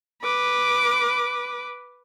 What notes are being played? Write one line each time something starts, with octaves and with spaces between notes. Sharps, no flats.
B4 D6